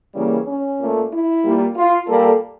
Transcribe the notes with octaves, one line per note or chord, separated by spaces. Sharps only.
C#3 E3 G3 A#3
C#4
A#2 A3
E4
A#2 G3 A#3
F4
A#2 G3 A#3 A4